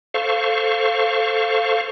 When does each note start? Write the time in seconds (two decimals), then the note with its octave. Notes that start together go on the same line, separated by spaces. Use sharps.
0.14 A4 C5 F5 C#6